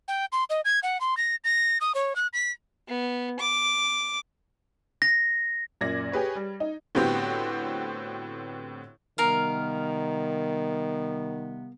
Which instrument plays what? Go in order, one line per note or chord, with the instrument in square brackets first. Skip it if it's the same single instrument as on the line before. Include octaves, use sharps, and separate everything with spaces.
[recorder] G5
C6
D#5
G#6
F#5
C6
A#6
A#6
D#6
C#5
F#6
B6
[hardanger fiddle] B3
D6
[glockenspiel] A#6
[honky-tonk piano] F#2 A#2 D5 G#6 A#6
G4 G#4 B4 C#5
G3
D#4
A2 D3 B3 C4 F#4 G4
[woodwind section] C3 G3 B3 [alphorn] D#3 [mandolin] A#4 F5